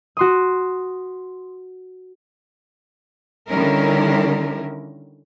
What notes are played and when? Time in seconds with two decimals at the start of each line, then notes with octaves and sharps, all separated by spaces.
0.17 F#4 C6 D#6
3.49 D3 D#3 G3 C#4 E4 A#4